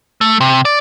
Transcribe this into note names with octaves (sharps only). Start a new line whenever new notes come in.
A3
C3
D5